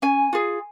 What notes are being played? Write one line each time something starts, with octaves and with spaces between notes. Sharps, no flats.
C#4 G#5
F4 G#4